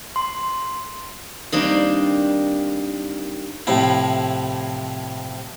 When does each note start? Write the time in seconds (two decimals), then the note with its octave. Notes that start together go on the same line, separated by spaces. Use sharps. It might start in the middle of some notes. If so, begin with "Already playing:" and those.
0.16 C6
1.52 D#3 G3 A#3 C4 D4
3.67 A2 C3 F3 E4